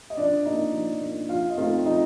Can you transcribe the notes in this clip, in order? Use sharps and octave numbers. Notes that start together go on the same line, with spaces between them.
D#5
F3 D4 D5
A#3 D4 D#4 D#5
F3
A#3 D4
F3 F4 F5
D#5
A3 C4 D#4 F4 F5
F3 D#4 D#5